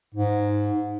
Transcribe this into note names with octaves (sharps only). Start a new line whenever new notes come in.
G#2